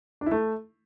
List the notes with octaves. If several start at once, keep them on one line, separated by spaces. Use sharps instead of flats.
D4
E4
A3